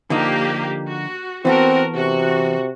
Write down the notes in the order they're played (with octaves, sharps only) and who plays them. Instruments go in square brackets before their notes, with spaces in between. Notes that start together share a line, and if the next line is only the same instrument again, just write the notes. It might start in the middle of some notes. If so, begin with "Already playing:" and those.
[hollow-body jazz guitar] D3 F3 D#4 [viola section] A#3 G4
[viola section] F#4
[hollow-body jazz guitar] E3 B3 A4 [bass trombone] C4 [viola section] F#4 A#4
[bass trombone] C3 [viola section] F#4